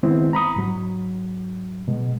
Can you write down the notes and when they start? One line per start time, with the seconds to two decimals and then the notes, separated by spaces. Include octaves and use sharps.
0.03 D#3 G#3 B3 C4 E4
0.33 A#5 B5 D#6
0.56 G#2 F#3
1.88 B2 G#3